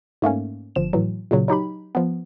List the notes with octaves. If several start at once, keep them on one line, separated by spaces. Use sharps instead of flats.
G#2 A3 A#3 C#4
G1 F3 E7
A2 E3 F#3
A#2 C#3 F#3
F#3 D#4 G4 B5
F3 B3